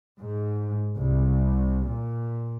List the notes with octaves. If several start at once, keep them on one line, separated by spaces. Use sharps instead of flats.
G#2
C2
A#2